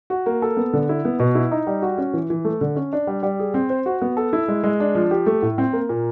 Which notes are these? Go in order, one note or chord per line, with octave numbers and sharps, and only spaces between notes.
F#4
A#3
A4
B3
D3
E4
B3
B2
E4
D#4
G3
F#4
C#4
E3
E3
A3
D3
C#4
D4
G3
G3
G#4
C4
C5
F#4
B3
A4
E4
G#3
G#3
D4
F3
G4
A3
A2
C4
A#3
A#2